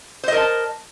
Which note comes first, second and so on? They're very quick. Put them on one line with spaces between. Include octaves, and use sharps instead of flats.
C5 D#5 A#4 A5